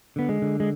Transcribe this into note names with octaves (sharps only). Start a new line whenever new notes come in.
D3 B3
G#3
D3
G#3